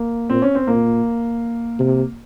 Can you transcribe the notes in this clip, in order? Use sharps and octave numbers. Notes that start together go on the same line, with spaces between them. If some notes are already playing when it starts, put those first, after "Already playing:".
Already playing: A#3
A#2 C4
C#4
C4
A#2 A#3
C3